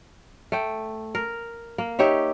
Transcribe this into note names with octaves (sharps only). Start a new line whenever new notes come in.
A3 G5
A#4
A#3
D#4 G4 C#5 E5